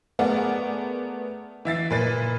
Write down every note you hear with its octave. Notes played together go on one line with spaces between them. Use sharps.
A3 B3 G#4 A#4 D5 F#5
E3 E5 A6 C7
A#2 B4 A6